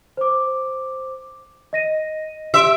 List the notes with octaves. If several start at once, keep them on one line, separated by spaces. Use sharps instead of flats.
C5 D6
D#5 A#6 D#7
G4 E5 C6 D7